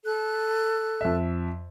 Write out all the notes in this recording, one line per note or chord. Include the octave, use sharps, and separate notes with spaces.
A4 F#6
F2 E5